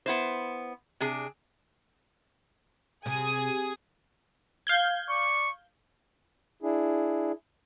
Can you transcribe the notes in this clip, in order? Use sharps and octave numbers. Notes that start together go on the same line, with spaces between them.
B3 E4 C5
C3 D4 G#4
C3 G#4 G#5 D#6
F5 G6 G#6
D5 C#6
D4 E4 G#4